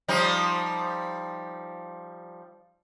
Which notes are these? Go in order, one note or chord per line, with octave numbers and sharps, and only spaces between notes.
F3 G3 D#4